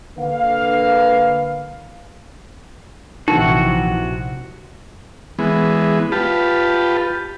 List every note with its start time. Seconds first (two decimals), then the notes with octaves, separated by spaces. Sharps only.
0.18 D3 A#3 B4 F5
3.28 A#1 C3 E3 D#4 F#4
5.39 E3 G#3 B3
6.12 F4 G4 B4 A5